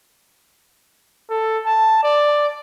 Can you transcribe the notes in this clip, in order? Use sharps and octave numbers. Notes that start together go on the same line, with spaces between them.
A4
A5
D5